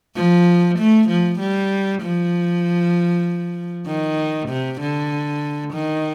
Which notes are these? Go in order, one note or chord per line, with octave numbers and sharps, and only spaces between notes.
F3
A3
F3
G3
F3
D#3
C3
D3
D#3